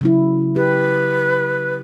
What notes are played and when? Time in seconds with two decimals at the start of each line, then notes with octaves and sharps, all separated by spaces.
0.01 C#3 F#3 E4
0.56 G4 B4